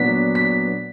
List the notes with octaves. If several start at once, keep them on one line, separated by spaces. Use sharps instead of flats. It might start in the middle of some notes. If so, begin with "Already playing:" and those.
Already playing: A#2 F#3 B3 D4 B6
B6